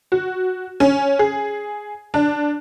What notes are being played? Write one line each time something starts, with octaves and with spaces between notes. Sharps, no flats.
F#4
C#4
G#4
D4